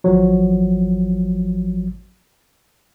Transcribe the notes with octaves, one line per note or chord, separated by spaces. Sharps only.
G#1 F3 F#3